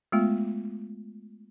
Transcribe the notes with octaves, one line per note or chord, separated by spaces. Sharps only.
G#3 A3 B3 F4